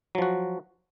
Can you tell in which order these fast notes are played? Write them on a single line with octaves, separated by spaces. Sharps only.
F#3 F3 F#4